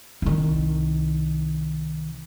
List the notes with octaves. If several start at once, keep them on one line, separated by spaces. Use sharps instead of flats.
C2 D#3